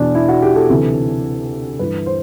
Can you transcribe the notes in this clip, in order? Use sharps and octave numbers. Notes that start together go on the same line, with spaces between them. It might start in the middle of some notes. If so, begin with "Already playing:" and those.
Already playing: E2 B2 D4
E4
F#4
G4
A4
D2 C3 E3
G2 E3 B4
C5